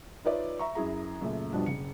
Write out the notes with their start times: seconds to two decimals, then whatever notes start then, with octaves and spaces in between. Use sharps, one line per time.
0.25 D#4 F4 B4 C#5 D5 E5
0.59 E5 A#5 C#6
0.75 F#2 E4 G#4 A#5
1.21 F#2 A#2 C#3 A3
1.53 G2 B2 F3 G3 D4
1.66 F#1 C#7